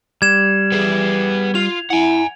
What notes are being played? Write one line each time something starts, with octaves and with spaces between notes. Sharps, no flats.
G3 G#6 E7
B3 G#4
F4 F7
E4 F#5 G#5